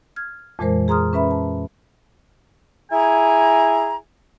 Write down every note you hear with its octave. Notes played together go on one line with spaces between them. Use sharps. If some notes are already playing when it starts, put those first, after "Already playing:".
F6 G#6
F2 A#2 E3 G#3 A#4 C5
G#4 A#5 C6 D#6 F6
C#4 B4 E5 B5
A5
E4 G#4 G#5 A#5